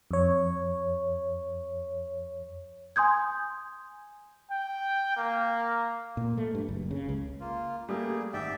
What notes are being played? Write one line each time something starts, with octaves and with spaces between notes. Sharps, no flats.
F2 C#5
G#5 C6 D#6 G6 G#6
G5
A#3
A#2
A3
G2
F#1
C#3
C#2
A#3 F4
G3 A3 A#3 G#4
G#1 D5 E5 G5